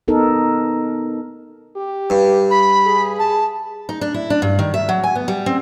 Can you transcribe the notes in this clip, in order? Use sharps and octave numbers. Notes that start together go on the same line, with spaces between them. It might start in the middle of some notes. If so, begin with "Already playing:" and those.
B3 D#4 A4 A#4
G4
G2
B5
G#4
A5
D#4
D4
E4
D4
G2
D#3
E5
F#3
G#5
B3
G3
C4